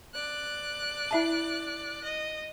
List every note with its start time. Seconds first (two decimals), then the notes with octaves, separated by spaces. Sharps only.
0.14 D5 F#6
1.11 E4 E5 A5
2.04 D#5